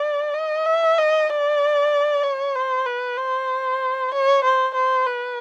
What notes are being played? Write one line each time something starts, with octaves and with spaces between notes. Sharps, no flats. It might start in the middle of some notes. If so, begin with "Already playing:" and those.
Already playing: D5
D#5
E5
D#5
D5
C#5
C5
B4
C5
C#5
C5
C5
B4